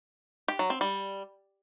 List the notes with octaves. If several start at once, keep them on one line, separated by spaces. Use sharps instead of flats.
G4
F#3
C4
G3